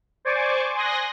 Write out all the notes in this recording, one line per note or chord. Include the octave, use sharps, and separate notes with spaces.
C5 D5 G#5 C#6 D6
G#5 C6 D#6 F#6 A#6